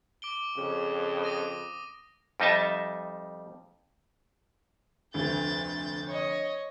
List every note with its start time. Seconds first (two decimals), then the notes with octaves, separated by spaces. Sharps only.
0.22 D6 D7 G7
0.57 F2 C#3
1.24 D#6 A#6 D#7
2.40 F2 G3 D#4 D#5 E5 A5
5.14 F1 D2 G6 A6
6.07 C#5 D#5